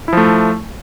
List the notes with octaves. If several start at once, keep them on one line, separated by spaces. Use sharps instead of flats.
F3 A3 E4